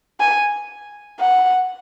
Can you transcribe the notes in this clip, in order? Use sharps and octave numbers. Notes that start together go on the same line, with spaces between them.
G#5
F#5